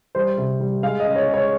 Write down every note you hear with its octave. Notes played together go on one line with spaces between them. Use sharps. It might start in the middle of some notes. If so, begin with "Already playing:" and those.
G3 C5
C3
G3
G#3 F5
D#5
C#3
C#5
G#3
C#5